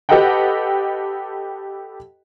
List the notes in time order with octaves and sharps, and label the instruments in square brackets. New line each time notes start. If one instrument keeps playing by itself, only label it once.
[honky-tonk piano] G4 A4 B4 D#5 F#5 G5